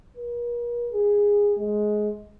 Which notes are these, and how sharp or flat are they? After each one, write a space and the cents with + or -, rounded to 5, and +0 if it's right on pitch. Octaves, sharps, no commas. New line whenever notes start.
A#4 +45
G#4 -15
G#3 +15